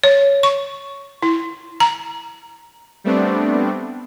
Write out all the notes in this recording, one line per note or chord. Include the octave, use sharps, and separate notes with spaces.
C#5
C#6
E4
A#5
G3 A3 B3 C4 D4